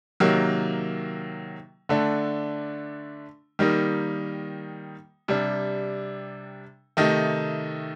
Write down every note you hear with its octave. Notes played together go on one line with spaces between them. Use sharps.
C3 D#3 F#3 A#3
D3 A3 D4
D#3 G3 A#3 D#4
C3 G3 D4
C3 D#3 A3 D#4